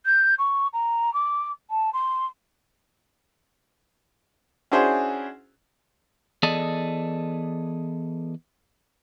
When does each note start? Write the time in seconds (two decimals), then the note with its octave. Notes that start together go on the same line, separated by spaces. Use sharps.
0.06 G6
0.38 C#6
0.73 A#5
1.14 D6
1.70 A5
1.93 C6
4.72 C#4 D4 E4 F#4 G#4 C5
6.43 E3 B3 G#4 A4 D5 D#5